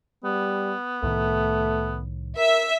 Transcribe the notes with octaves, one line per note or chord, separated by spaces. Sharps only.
G3 B3
C2 A2 D#3 A3
A#4 E5